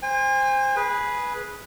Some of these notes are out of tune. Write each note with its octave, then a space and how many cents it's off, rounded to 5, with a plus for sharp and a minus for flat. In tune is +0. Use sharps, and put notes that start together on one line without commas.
C5 +0 G#5 -40
G#4 +0 B4 -10